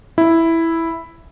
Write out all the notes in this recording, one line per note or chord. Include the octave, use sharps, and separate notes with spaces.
E4